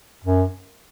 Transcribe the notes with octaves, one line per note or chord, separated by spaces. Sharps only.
F#2